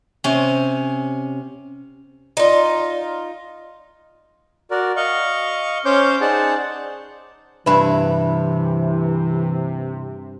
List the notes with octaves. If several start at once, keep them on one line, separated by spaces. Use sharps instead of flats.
C3 C#4
D#4 F4
F#4 A#4 D5
D#5 F5 C#6
C#4 C5 C#5 C6 D6 G6
D#4 G#4 C5 D5 F#5 A5
G2 C3 E3 E4 B4